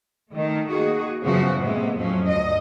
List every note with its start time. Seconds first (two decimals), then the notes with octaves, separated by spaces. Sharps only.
0.32 D#3 A3
0.69 D#3 A#3 F#4 G#4
1.24 F#2 C#3 E3 F3 B3 F#4
1.60 A2 C3 G#3 A#3 B3
1.95 F2 A2 F3 F#3 C#4
2.27 D2 G2 D#5